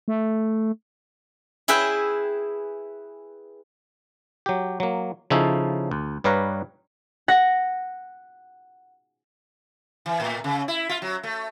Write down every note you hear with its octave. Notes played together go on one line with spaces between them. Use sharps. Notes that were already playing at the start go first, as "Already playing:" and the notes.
A3
E4 G#4 B4 E5 G5
F#3 G4
F#3 A#3
C#3 F3 C#4 D#4 E4 A4
D2
G2 G3 B4 C#5 F5 A#5
F#5 A#6
E3
A2
C#3
E4
F4
F#3
A3